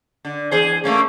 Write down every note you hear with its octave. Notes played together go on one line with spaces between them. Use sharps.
D3
E2 G#4 C5
A3 A#3 C#4